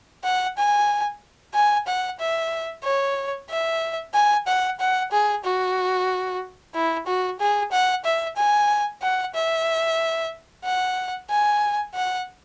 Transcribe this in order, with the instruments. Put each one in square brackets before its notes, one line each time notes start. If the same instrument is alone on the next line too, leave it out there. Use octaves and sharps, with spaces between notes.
[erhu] F#5
G#5
G#5
F#5
E5
C#5
E5
G#5
F#5
F#5
G#4
F#4
E4
F#4
G#4
F#5
E5
G#5
F#5
E5
F#5
G#5
F#5